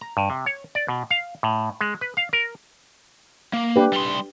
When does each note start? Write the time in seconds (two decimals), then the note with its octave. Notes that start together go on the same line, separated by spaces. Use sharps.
0.01 A#5
0.17 G2
0.30 C3
0.46 C#5
0.75 D5
0.88 B2
1.10 F5
1.43 A2
1.81 G#3
2.01 B4
2.17 F5
2.33 A#4
3.53 A#3
3.76 D4 G4 B4
3.93 G3 C6